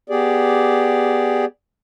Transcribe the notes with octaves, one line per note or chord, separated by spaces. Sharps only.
B3 G4 G#4 D5